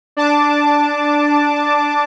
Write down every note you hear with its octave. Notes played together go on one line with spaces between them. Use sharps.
D4 A5 D6